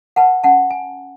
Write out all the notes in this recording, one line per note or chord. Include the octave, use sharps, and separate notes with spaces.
B4 F#5 A5
C#4 F#5 A5
G#5